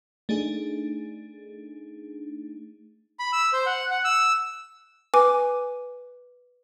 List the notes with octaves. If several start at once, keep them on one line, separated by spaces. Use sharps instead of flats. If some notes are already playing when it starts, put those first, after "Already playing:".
A3 D4 D#4 G#4
B5
E6
C5
F#5
F#5
E6
B4 G#5 D6